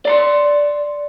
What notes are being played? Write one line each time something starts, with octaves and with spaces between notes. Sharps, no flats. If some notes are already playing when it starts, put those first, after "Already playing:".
D5 A#5 C6